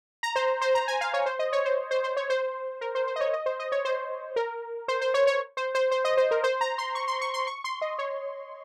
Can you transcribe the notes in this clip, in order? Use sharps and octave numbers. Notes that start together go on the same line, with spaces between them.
A#5
C5
C5
A#5
G#5
F5
C#5
C5
D#5
C#5
C5
C5
C5
C#5
C5
A#4
C5
C5
D#5
C#5
D#5
C5
D#5
C#5
C5
A#4
C5
C5
C#5
C#5
C5
C5
C5
D#5
C5
A#4
C5
A#5
C6
C#6
C6
C#6
C6
C#6
C6
D#5
C#5